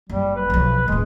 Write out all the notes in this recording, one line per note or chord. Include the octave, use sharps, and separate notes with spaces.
F#1 G3
B4
B1 F3
D#1 A2 G#3